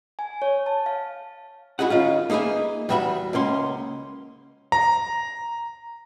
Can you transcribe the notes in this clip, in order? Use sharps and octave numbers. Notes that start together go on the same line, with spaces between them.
G#5
C#5
A5
F5
E4 F#4 G#4 D#5 F#5
D#3 C#4 F4
A#3 D#4 G#4 B4 E5
E2 G3 F#4 E5 B5
C#2 A#3 C#4 C6
A#5